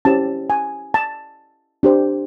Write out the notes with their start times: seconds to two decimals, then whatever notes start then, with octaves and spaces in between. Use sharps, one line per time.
0.05 C#4 E4 G4 C5 A5
0.50 G#5
0.94 A5
1.83 D4 G4 C5